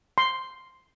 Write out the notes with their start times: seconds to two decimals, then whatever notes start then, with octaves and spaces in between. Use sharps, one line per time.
0.18 C6